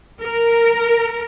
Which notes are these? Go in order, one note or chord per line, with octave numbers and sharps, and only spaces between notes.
A#4